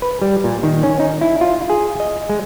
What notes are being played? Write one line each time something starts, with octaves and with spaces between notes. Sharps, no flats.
B4
G3
A#2
D#3
C#4
D#4
E4
F4
G#4
D#5
G#3